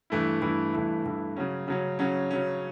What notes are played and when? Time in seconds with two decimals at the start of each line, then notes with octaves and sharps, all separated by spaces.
0.10 G2 E3 A3 E4
0.42 G2 E3 A3 E4
0.73 G2 E3 A3 E4
1.05 G2 E3 A3 E4
1.36 C#3 F#3 C#4
1.68 C#3 F#3 C#4
1.99 C#3 F#3 C#4
2.31 C#3 F#3 C#4